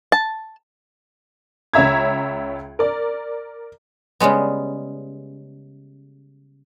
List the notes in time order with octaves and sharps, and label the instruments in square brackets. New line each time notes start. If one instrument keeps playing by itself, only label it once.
[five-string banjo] A5
[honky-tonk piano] C#2 C#4 C#5 E5 A#5 G#6
A#4 D5
[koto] C#3 G3 G#3 B3